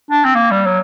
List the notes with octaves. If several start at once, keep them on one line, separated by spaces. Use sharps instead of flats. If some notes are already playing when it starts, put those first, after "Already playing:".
D4
C4
A#3
G3
F#3